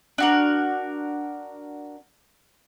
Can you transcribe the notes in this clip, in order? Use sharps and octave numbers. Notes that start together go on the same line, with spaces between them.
D4 F#4 A#4